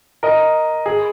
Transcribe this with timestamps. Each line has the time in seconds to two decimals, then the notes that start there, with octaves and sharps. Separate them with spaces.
0.23 A#4 D#5
0.86 G#4